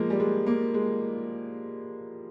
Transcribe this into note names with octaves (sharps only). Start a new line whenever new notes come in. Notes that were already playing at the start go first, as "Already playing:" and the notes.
Already playing: F3 G#3 A#3
G3
G#3
A#3
G#3